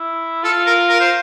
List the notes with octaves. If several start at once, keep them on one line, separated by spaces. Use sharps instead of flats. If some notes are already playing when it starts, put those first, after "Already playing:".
Already playing: E4
F4 A4
A#4
A#4
C5